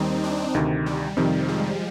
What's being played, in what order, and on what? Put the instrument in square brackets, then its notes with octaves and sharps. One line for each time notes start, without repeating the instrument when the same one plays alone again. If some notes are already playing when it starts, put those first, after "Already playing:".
Already playing: [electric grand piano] D#2 D#3 G3 [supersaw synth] C4 D#4
[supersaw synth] D4
[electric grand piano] D2 C3 D#3
[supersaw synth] G3
[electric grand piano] F2 C3 D#3 [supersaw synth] F3
[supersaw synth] G#3